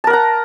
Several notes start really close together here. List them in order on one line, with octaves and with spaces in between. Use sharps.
A5 A#4 F#5 A#5